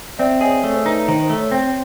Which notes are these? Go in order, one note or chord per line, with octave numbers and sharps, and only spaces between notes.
C4 D5 E5
G#4 C#5 D#5
A3 C#5
C5
D#4 B4
B4
D#3 C5
C5
A3
C#5
C4 C5